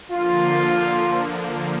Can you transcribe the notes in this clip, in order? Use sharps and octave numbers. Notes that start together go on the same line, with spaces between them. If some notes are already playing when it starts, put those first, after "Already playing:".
D3 F3 A#3 F4